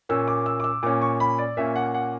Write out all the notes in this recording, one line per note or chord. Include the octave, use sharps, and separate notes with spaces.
A#2 A#3 C#4 E6
D6
E6
D6
E6
A#2 A#3 C#4 D6
C#6
B5
D5
A#2 A#3 C#4 E5
F#5
F#5